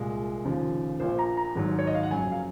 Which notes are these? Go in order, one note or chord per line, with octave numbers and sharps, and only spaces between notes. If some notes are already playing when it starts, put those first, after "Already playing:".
Already playing: C2 A#2 G#3
F1 D#2 C#3 F3
A#1 A#2 F3 C5
A#5
A#5
G#1 G#2 F#3
C#5
D#5
F5
F#5
F#1 F2 C#3 F#3 G#5
F5